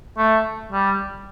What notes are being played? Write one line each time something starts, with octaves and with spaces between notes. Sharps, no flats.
A3
G3